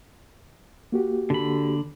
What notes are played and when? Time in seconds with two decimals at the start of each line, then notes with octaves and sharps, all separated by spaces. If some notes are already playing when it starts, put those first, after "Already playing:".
0.92 A#3 F#4 G4
1.30 D3 B5